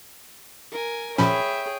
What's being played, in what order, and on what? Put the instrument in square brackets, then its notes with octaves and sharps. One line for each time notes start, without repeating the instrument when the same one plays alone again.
[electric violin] A#4 G#5
[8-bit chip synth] A#2 F3 C#4 [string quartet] G#4 C#5 G5 [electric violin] E5 [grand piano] B5